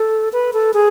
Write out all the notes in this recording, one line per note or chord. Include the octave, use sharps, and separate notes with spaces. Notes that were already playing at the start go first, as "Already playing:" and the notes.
Already playing: A4
B4
A4
G#4